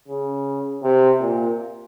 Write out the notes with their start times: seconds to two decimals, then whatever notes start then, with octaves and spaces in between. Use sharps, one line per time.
0.08 C#3
0.83 C3
1.20 A#2